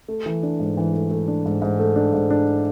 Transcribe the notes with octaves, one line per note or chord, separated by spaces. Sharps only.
A3
E3
D4
G#2
E3
A3
A3
D4
G#2
G#2
A3
D4
G#2
D4